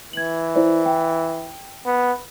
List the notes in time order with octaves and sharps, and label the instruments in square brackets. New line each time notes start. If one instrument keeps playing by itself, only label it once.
[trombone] E3 [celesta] G#6 F#7
[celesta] E4 C5 D5
G5
[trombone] B3